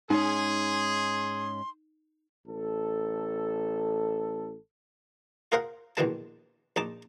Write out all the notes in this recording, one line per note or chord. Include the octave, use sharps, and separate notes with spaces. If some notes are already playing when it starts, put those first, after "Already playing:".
G#2 G#3 C#4 D#4 G#4 C6
A1 A4
F4 G#4 A#4 C5 F5 F#5
A#1 B2 D#3 E3 G#3 A5
A#1 D#4 A5 D6